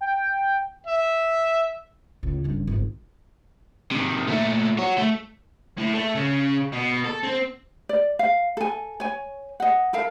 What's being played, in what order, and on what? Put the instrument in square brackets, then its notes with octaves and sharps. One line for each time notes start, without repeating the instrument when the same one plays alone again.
[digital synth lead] G5
[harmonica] E5
[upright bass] C#2 A2
F#1 G2
G#1 F3
[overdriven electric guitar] C3 D#3
A#2 A3
F#4 C#5
A3
A2
A3
C#3
B2
A4
C4
[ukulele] D5
F5
A4 G#5
C#5 G#5
D#5 F#5
A4 A#4 F5